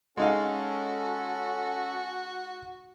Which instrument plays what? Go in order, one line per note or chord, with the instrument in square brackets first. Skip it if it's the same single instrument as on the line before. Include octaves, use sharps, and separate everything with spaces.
[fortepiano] G#3 D#4 F5 [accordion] C#4 A4 [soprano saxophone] F#4